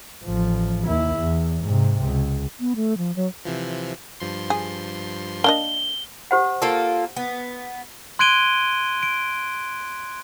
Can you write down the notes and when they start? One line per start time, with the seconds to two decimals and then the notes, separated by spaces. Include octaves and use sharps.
0.24 A1 F3
0.85 D#2 E4
1.18 E2
1.65 G#2 C3
2.04 C#2
2.60 B3
2.76 A3
2.98 F3
3.16 F#3
3.45 C3 E3 F3
4.20 G2 F3 C6
4.50 G#4
5.44 A#3 D4 D#5 G7
6.31 G4 C5 F#5
6.62 A#3 F4 A4
7.17 B3
8.19 C6 F#6 G#6 D7 D#7 G7
9.03 D7